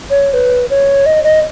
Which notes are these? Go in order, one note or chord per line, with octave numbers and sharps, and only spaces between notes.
C#5
B4
C#5
D#5
D#5